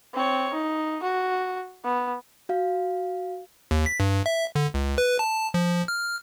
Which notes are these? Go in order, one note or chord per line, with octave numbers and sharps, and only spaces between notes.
C4 C#5
D#4
F#4
B3
F#4 F5
D#2
B6
G2
E5
D3
C#2
B4
A5
F3
F6